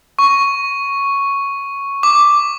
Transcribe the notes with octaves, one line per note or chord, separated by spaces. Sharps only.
C#6
D6